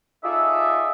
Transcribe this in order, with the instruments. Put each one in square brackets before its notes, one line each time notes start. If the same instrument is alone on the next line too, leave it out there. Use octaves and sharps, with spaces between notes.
[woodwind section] D#4 F4 G#4 A4 D5 E5